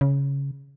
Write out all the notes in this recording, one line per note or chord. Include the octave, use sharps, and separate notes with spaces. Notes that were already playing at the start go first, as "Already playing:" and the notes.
C#3